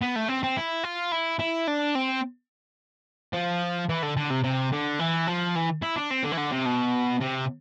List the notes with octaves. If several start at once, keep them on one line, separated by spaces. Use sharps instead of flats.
B3
A3
C4
C4
E4
F4
E4
E4
D4
C4
F3
E3
D3
D3
C3
C3
D3
E3
F3
E3
E4
D4
C4
D3
E3
D3
C3
B2
C3